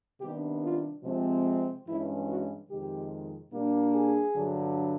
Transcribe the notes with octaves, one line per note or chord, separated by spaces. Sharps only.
C3 D#3 G3 B3 D4 G4
F4
C3 F3 G#3 C4
G2 E3 G#3 C#4 E4
F#4
F2 C3 D#3 G#3 G4
A#2 G3 A#3 D4
G#4
G2 D3 F#3